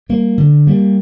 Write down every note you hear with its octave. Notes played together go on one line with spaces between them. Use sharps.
G3 A#3
D3
G3 A#3